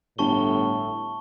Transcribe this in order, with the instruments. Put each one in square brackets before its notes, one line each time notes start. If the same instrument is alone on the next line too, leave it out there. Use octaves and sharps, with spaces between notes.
[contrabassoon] G1 [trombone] A2 [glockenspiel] A5 C#6 G7